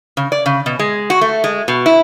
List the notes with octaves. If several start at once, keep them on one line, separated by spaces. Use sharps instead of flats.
C#3
D5
C#3
B2
G#3
F#4
A3
G#3
B2
E4